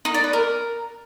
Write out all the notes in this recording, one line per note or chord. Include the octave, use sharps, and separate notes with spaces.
D#4
D5
B4
A#4